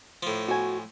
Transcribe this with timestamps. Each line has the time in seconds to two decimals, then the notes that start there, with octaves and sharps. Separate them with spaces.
0.23 A2 F3
0.48 F#4 G#5